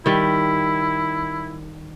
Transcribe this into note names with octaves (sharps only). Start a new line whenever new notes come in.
D#3 G3 E4